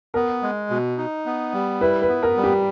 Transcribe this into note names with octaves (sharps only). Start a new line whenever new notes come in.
B3 A#4
G#3
B2
D#4
B3
G3
E4 B4
B4
B3
A#4
G3
G4